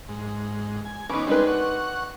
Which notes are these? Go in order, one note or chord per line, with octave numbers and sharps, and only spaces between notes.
G#2
G#5
E3 B3 C#4 D#4 D6
G3 G#3 C4 D4 D#4 B4
F#5 C#6